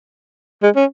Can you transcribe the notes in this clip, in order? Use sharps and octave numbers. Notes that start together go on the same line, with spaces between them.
G#3
C#4